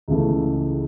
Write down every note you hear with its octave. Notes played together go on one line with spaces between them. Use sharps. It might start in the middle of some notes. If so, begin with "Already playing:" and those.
C#2 C#3 E3 A3